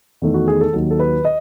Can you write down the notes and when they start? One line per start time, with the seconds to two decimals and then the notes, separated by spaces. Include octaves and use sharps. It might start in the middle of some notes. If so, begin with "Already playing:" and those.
0.22 E2 D#3 A3
0.34 F#4
0.48 G#4
0.61 A4
0.73 D#2 D#3 F#3
0.91 A4
0.99 B4
1.25 D#5